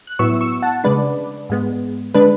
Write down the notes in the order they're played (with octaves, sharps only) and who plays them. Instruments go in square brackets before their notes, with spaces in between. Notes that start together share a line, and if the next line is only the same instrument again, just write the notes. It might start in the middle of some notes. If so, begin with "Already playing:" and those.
[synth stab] F#6
A2 F#3 B3 E4 C#6 E6
C#6 E6
F#5 A5
C#3 G#3 D4 B4 D5
G#2 G#3 B3
D3 G#3 D4 B4